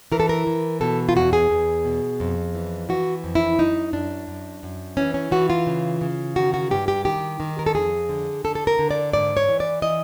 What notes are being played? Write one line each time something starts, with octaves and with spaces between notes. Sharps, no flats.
E3 A#4
A4
A#4
E3
B2 A4
F4
E2 F#4
G#4
E2
B2
F2
E3
E3 F#4
F2
E4
F#2 D#4
F#2 D4
F#2
F#2
E3 C#4
C#4
E3 F#4
F4
C#3
C#3
D#3 F#4
F#4
G2 G4
G4
D#3 G4
D#3
A#4
A4
F2 G#4
D3
D3 A4
A4
A#4
D3
D5
G#2 D5
C#5
E3
D5
E3 D#5